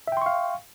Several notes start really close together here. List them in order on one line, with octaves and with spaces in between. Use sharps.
E5 G5 C6 C#6 F5